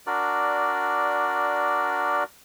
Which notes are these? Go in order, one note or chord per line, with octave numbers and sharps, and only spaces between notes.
D4 F#4 A#4 D5